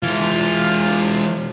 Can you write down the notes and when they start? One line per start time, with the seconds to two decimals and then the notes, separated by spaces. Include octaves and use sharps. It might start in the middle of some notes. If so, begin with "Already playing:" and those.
0.03 E3 G#3 F4